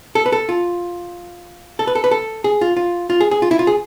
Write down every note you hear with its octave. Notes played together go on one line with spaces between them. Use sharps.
A4
B4
A4
F4
A4
B4
A4
B4
A4
G#4
F4
F4
F4
G#4
G#4
F4
E4
F4
G#4